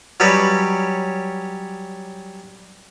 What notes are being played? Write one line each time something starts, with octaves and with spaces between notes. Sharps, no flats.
F#3 G3 C#4 G4 B4 D#5